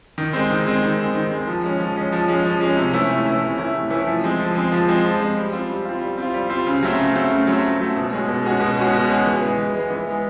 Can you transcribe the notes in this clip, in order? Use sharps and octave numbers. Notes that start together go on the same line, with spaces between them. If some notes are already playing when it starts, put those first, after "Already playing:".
D#3
G#3 C4
D#3
G#3 C4
D#3
G#3 C4
D#3
G#3 C4
F3
G#3 C#4
F3
G#3 C#4
F3
G#3 C#4
F3
G#3 C#4
C3
E3 A3 C#4 E4
C3
E3 A3 C#4 E4
C3
E3 A3 C#4 E4
C3
E3 A3 C#4 E4
F3
G#3 C4
F3
G#3 C4
F3
G#3 C4
F3
G#3 C4
G3
C4 F4
G3
C4 F4
G3
C4 F4
G3
C4 F4
C#3
F#3 A3 C4
C#3
F#3 A3 C4
C#3
F#3 A3 C4
C#3
F#3 A3 C4
B2
G#3 C#4 F#4
B2
G#3 C#4 F#4
B2
G#3 C#4 F#4
B2
G#3 C#4 F#4
E3
G#3 B3
E3
G#3 B3
E3
G#3 B3